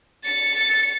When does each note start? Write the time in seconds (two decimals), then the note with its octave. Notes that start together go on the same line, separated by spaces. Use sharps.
0.24 A6 C#7